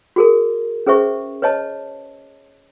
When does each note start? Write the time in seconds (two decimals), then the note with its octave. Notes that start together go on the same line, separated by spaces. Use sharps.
0.16 F#4 G#4 A#4
0.87 C#4 G#4 B4 C5 E5 C#6
1.42 B4 C#5 D#5 A5